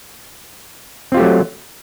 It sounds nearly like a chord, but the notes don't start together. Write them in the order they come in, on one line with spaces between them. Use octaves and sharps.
C4 F4 G4 A3 F#3